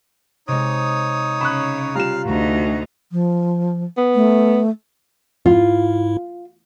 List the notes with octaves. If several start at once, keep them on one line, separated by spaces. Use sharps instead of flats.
C3 G#3 D#4 C#5 D#6
C#3 B5 C#6 F#6 E7
G3 F4 F5 A#5 F6 E7
D2 D#4 F#4
F3
B3
A3
G#2 E4 F4